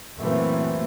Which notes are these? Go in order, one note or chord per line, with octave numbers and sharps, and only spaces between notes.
F#2 A#2 E3 A3 A#3 C4